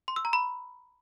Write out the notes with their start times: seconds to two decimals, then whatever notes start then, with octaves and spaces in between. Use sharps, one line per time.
0.08 C6
0.16 E6
0.25 A#5
0.33 B5